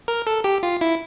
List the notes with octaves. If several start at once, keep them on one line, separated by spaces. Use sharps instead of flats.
A#4
A4
G4
F4
E4